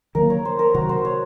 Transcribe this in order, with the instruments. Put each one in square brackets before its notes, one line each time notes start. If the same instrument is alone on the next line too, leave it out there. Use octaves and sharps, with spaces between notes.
[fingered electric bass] D#3 F#3 A#3 [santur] A#4
[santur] C#5
C5
A#4
[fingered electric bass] C3 D#3 F#3 [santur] F#4
[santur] C5
C#5